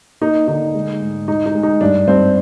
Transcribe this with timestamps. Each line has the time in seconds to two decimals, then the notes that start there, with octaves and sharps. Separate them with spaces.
0.21 A#3 D#4
0.48 D3 D#4
0.75 G#3
1.01 G#2
1.28 G#3 D#4
1.46 D#4
1.55 G#3
1.63 D#4
1.81 G2 D4
2.07 G2 C4